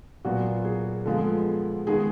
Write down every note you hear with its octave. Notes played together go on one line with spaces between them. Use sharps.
A#2 F#3 B3 F#4
G#4
D3 F3 G#3 B3
D#3 G#3 B3 G#4